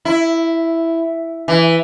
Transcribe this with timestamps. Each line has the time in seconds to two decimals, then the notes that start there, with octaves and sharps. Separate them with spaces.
0.05 E4
1.48 E3